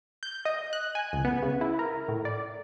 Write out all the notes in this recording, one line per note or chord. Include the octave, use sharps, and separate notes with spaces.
G6
D#5
F#6
G#5
C#2
B3
C#3
E4
A#4
A2
D5